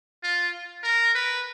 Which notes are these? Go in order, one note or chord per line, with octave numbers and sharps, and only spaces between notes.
F4
A#4
B4